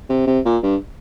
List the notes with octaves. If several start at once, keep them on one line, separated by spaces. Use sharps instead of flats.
C3
C3
A#2
G2